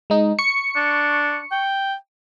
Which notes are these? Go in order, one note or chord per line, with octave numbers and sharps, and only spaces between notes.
G#3 D#4
C#6 C#7
D4
G5